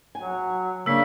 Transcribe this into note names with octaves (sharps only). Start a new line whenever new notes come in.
F#3 G#5
C#3 A#3 D4 E6 B6